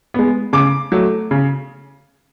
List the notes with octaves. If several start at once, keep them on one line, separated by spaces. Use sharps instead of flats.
G#3 B3
C#3 D6
F#3 A3
C#3